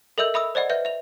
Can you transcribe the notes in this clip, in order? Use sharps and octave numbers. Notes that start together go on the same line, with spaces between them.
A4 A#4 D#5 E5 E6 G6
E5 B5 D#6 E6
C5 D5 D#5 F#5
B4 E5 G6
E5 F7